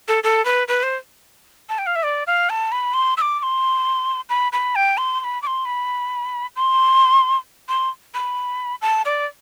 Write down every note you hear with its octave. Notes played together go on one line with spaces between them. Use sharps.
A4
A4
B4
B4
C5
A5
G5
F5
E5
D5
F5
A5
B5
C6
E6
D6
D6
C6
B5
B5
G5
C6
C6
B5
D6
C6
B5
C6
C6
B5
A5
D5